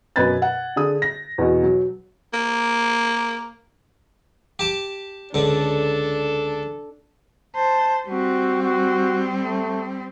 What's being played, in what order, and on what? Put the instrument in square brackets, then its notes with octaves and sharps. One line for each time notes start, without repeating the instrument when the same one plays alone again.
[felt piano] F#2 B2 B4 B5 G#6 A6
F#5
D3 G#4 D#6
A#6
E2 B2
F#3
[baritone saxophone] A#3
[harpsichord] G4 A5 D6
[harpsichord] C#2 D3 [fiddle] D4 A4
[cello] C5 [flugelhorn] A5
[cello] G3 C4 [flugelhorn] F#4
[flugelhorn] F#4
A3